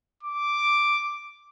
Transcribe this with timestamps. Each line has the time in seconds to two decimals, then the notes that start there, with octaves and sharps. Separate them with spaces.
0.23 D6